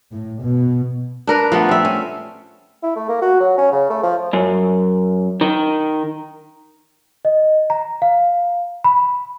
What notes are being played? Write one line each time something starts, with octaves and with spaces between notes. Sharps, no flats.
A2
B2
D4 A#4 B4
F3 A3 B3
C4 E5
C#4
E4
A3
A#3
F#4
F#3
C#4
C#3
A3
F3
F#2
D#3
D#5
A#5
F5
B5